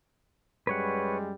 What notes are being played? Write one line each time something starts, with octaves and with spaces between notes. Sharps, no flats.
F#2 G3 G#3 B4 C#5 F#5